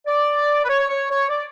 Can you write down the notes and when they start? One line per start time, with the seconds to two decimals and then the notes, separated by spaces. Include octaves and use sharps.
0.07 D5
0.65 B4
0.69 C#5
0.89 C#5
1.10 C#5
1.30 D5